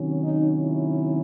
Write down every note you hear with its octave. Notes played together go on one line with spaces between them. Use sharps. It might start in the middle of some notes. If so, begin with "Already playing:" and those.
Already playing: C3 D#3 F#3 C#4
D#4
E4